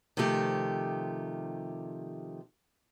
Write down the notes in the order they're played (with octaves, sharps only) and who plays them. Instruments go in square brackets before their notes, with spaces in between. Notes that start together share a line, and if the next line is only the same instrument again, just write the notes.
[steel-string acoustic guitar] C3 D#3 F3 A3 G4